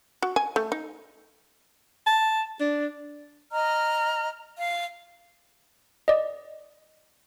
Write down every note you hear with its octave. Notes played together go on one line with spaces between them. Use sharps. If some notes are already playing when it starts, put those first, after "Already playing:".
F#4
G#5
A3
D#4
A5
D4
D#5 A#5 F6
F5
D5 D#5